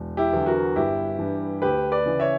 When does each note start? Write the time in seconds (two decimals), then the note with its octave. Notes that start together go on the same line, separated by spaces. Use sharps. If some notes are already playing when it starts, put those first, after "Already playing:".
Already playing: E1
0.17 E4 G4
0.33 E2 D3 F#3
0.46 F#4 A#4
0.76 G1 E4 G4
1.19 G2 E3
1.62 D2 G4 B4
1.92 B4 D5
2.05 C#3 E3
2.20 C#5 E5